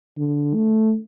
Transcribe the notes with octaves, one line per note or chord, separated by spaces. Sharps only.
D3
A3